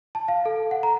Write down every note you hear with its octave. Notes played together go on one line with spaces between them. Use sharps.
A5
F5
A4
F#5
A#5